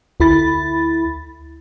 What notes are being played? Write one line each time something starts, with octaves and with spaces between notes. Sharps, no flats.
D2 E4 B5 A6